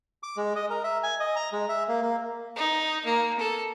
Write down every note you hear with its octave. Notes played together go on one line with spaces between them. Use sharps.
D6
G#3
D#5
A#4
E5
G#5
D#5
A#5
G#3
E5
A#3
A#3
D#4
A#3
A4